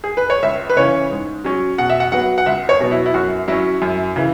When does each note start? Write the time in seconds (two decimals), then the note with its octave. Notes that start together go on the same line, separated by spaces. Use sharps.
0.04 G#4
0.17 B4
0.30 C#5
0.43 C#2 E5
0.70 B4
0.77 C#3 E3 C#4 C#5
1.11 G#2
1.44 F#3 C#4
1.78 B2 F#5
1.90 E5
2.00 F#5
2.12 F#3 B3 F#5
2.38 F#5
2.46 C#2 E5
2.69 C#5
2.80 B2 F#3 B3
2.91 E4
3.06 E4
3.14 F#2 F#4
3.48 F#3 C#4 E4
3.82 F#2
4.16 C#3 E3